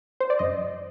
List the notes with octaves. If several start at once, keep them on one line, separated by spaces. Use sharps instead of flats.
C5
D5
F#2 D#5